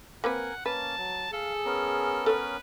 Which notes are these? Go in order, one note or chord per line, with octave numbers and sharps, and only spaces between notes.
A#3 C4 A#4 B4 F#5 G#5
A#3 C#4 B4 A5
F#3
G#4 A4 F5
B3 C#4 A#4
A4 B4 C#5